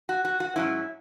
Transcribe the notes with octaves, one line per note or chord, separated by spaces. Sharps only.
F#4
F#4
F#4
G#2 F#3 C#4 E4